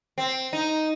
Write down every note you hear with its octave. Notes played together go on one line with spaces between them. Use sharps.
C4
D#4